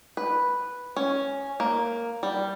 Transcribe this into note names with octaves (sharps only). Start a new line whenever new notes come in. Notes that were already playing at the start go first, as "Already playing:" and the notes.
B4
C#4
A#3
G3